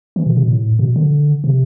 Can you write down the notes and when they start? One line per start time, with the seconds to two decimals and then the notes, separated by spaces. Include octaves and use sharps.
0.16 E3
0.26 B2
0.37 B2
0.48 A2
0.79 B2
0.96 D3
1.44 C3